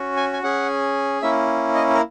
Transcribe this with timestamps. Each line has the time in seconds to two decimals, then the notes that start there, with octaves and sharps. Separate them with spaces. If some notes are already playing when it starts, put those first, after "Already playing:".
Already playing: C#4 F#4
0.17 G#5
0.33 G#5
0.43 C#4 G#4 F#5
1.22 A#3 C#4 E4 E5
1.75 D#5
1.94 A#4